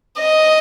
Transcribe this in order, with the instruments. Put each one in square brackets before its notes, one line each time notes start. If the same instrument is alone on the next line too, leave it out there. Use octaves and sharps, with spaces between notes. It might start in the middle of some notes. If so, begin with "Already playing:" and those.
[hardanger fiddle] D#5